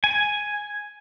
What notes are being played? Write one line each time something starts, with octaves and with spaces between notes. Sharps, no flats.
G#5